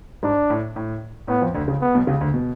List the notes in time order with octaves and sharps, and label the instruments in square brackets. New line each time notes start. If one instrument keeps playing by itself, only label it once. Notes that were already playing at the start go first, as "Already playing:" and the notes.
[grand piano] G#2 [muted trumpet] D4
[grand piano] A2
A2
[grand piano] A2 [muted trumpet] B3
[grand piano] F2 F3
D2 D3
C#2 C#3
[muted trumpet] B3
[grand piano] B1 B2
C#2 C#3
D2 D3
B2